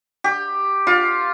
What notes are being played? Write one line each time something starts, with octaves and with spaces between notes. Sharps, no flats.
G4
F4